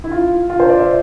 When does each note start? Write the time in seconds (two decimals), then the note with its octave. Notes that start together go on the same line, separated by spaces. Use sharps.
0.04 E4
0.11 F4
0.50 F4
0.60 C5
0.69 D5
0.79 E5